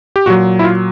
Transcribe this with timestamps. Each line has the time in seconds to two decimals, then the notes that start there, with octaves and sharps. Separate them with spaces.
0.16 G4
0.26 A#2 F#3 F#4
0.59 E4
0.64 F4